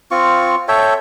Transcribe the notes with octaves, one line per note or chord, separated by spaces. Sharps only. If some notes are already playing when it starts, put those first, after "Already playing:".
C4 F4 C#6
A4 C#5 E5 G5